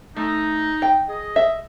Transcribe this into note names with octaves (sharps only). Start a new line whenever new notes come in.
A3 D#4
G5
G#4 D#5
E5